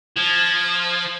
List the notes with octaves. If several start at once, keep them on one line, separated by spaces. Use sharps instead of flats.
F3 G#6